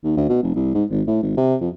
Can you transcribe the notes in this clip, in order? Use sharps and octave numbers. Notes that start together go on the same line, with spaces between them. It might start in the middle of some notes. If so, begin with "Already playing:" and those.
D#2
D2
B2
F1
C2
G#2
G#1
A2
G#1
C3
F2